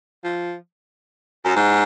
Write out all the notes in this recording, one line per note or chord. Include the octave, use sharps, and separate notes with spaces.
F3
F#2
G#2